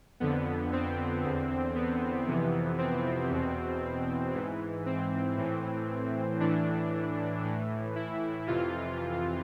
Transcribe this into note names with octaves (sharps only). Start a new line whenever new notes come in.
F2 D3 B3
C4
E2 D3
B3
F2 C3 E3
C4
E2 B2
G#2 E3
C4
A2 E3
A2 E3 D4
A2 E3
E4
F2 C3 E3 F4